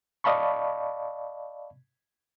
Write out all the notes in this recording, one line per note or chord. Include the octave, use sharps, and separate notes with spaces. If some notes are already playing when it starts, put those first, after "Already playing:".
D5 D#5 F5 A5 B5 C#6